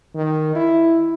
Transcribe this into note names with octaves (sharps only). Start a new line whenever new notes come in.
D#3
E4